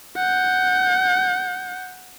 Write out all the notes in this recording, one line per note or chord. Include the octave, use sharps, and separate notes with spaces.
F#5 G6